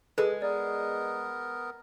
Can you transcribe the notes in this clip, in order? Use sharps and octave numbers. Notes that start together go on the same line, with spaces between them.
G#3 G#4 A4 B4
B3 A#4 D5